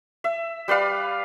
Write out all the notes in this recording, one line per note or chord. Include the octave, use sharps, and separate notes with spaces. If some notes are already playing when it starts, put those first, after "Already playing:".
E5
G3 B4 D5 F5